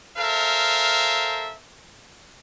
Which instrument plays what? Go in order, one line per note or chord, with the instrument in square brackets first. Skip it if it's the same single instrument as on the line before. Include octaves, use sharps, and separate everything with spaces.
[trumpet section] A4 A#4 C5 E5 F5